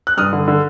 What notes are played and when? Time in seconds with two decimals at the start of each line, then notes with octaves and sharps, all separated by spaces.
0.07 F#6
0.17 G2 D#6 F6
0.33 D3
0.48 D3